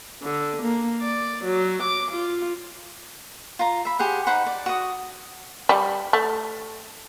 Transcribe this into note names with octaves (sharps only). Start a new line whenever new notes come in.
D3
A#3
D5
F#3
D6
F4
F4 A#5
E5 B5
G4 G#4 C5 F#5
D#4 C5 F#5 B5
D5
F#4 D#6
G3
A3